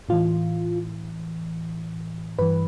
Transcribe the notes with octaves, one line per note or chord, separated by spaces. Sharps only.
A2 E3 F4
G2 E3 B4